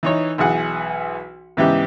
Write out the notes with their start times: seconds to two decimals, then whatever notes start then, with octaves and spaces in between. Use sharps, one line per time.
0.03 E3 D#4 C#5
0.38 B1 E3 G#4 F#5
1.57 G#2 C#3 E3 B3 E4 G4